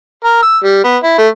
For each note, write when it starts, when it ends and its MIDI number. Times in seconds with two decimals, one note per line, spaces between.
0.24 0.42 70
0.43 0.58 88
0.64 0.80 55
0.84 0.96 59
1.04 1.18 64
1.18 1.27 57